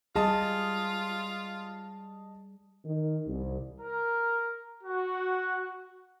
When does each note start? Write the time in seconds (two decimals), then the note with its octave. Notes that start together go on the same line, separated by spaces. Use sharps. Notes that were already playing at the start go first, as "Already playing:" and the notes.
0.16 G3 F4 G#4 D#5 A5 D#6
2.85 D#3
3.27 C2
3.80 A#4
4.83 F#4